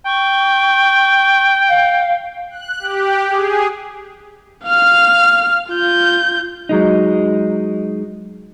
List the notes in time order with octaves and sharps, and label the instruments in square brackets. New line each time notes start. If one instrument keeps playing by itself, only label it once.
[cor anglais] G5 [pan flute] C#6
[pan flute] F5
[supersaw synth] F#6
G4
G#4
[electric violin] F5 F6
F4 G6
[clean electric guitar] F#3 G#3 D#4